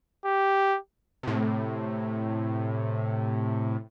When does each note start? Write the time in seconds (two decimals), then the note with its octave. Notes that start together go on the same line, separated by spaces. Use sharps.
0.25 G4
1.23 A2 C3